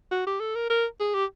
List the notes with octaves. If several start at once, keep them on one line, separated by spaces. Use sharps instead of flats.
F#4
G4
A4
A#4
A#4
G#4
G4